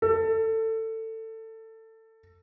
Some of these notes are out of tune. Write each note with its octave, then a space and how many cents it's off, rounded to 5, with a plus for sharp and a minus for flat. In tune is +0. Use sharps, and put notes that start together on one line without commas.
A4 +20